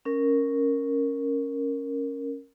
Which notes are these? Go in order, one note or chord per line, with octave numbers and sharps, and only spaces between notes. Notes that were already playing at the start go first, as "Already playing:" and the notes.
C#4 A#4